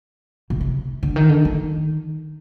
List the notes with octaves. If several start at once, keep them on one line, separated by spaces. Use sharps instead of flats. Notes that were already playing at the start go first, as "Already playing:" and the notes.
B2
C3
D3
D#3
D3
D#3